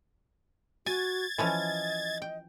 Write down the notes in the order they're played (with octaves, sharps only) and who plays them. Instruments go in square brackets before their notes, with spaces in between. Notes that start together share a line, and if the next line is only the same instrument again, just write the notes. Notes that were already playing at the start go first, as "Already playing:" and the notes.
[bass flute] F#4 [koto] G#5 [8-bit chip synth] G#6 A6
[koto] E3 F3 C#4 [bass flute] D#5
[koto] G5